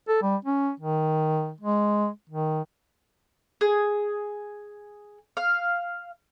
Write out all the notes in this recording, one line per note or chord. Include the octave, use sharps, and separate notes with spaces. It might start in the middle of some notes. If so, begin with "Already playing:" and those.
A4
G3
C#4
D#3
G#3
D#3
G#4
F5